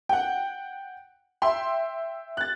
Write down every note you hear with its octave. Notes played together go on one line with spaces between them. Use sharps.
F#5 G5
E5 G5 C6
F#6 A6